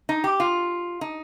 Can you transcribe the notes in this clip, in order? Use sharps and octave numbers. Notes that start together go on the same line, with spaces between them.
D#4
G4
F4
D#4